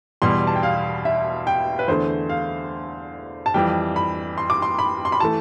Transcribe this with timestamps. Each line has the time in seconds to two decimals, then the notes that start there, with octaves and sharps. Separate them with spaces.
0.22 E2 B2 G3 C6
0.47 A5
0.56 G5
0.63 F5
1.05 E5
1.47 G5
1.79 B4
1.88 E2 D3 A3 C5
2.29 F5
3.46 A5
3.54 F2 E3 G3 G5
3.96 B5
4.38 C6
4.50 D6
4.62 C6
4.79 B5
5.05 C6
5.12 B5
5.20 E3 A3 A5